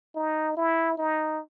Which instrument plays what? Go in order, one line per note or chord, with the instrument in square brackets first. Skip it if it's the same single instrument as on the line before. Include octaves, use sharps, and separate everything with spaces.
[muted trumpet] D#4
E4
D#4